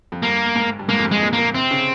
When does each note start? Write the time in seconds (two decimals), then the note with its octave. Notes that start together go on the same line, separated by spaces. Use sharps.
0.12 F2
0.23 G2 A#3
0.56 G#2
0.79 G2
0.89 G#2 A#3
0.99 F2
1.05 G2
1.12 G#3
1.22 A#2
1.33 A#3
1.38 A#2
1.55 C3 C4
1.71 C#3